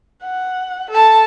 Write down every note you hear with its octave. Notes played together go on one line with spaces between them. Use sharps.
F#5
A4 A5